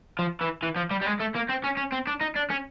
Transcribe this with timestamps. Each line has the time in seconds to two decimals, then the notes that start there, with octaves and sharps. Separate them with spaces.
0.19 F3
0.41 E3
0.62 E3
0.76 F3
0.91 G3
1.01 G3
1.06 G#3
1.19 A3
1.35 A#3
1.49 C4
1.64 C#4
1.77 C#4
1.92 C4
2.07 D4
2.21 D#4
2.36 D4
2.50 C#4